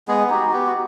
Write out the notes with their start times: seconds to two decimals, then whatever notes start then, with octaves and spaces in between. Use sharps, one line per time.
0.08 G#3 B3 G#4
0.30 D#4 F#4 G4
0.52 B3 G4
0.67 F#4